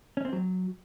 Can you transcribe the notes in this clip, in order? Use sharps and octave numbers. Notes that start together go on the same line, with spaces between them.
C#4
C4
F#3